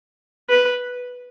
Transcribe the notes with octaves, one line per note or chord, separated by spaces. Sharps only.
B4